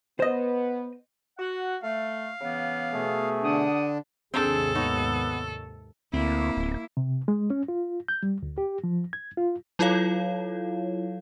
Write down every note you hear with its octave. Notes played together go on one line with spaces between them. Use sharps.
B3 C5 D#5
F#4 F#5
A3 F5
C#3 E3 B3
B2 A3 G#4
D3 D4 G4 F#5 D#6
D#2 G#2 C3 C4 D4 G#4 A4
B3 D#4 C#5
D2 A#3 C4 E4
D1
C3
G#3
C#4
F4
G6
G3
D2
G4
F3
G#6
F4
F#3 E4 F4 A4 C#5 F5